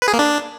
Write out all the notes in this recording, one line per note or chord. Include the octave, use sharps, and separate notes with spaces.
B4
G#4
A#3
D4